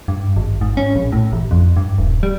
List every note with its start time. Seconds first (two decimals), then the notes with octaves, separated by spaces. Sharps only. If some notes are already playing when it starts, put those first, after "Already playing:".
0.08 G2
0.37 G#1
0.61 G#2
0.77 C#4
0.95 A#1
1.12 A2
1.33 A1
1.51 F2
1.77 G2
1.98 D#1
2.23 G3